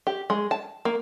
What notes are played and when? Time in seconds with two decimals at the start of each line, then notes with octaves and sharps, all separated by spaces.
0.07 G4
0.30 G#3
0.51 A5
0.85 A#3